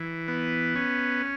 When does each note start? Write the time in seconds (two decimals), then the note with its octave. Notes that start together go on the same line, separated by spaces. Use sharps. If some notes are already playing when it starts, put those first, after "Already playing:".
Already playing: E3
0.28 B3
0.75 C#4